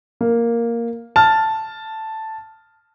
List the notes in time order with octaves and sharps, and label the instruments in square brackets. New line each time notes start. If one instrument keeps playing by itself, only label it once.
[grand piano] A#3
A5 F6